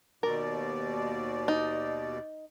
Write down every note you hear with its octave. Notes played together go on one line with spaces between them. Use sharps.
D#2 B2 A#4 D5
D#4